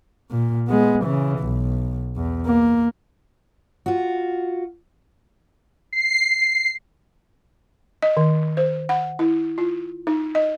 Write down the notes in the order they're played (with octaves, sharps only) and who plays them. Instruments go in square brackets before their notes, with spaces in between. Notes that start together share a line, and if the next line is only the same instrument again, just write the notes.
[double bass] A#2
G#3 B3
C#3 E3
B1
E2
A#3
[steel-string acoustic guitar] F4 F#4
[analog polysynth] C7
[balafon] D#5
D#3
C5
F#5
E4
F4
D#4
D#5